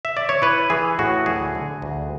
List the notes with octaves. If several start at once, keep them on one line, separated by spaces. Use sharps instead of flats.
E5
D5
C#5
E4 B4
E3 G#4
A2 F#4
D2 G#4
D3
D2